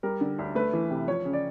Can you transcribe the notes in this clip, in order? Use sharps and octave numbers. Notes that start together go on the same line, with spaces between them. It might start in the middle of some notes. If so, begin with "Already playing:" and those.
G3 A#4
D3
D2
A3 B4
E3
C3
F3 C#5
C#3
D5